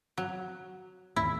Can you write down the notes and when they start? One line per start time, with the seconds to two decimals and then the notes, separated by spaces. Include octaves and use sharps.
0.18 F#3
1.16 D#2 A2 E4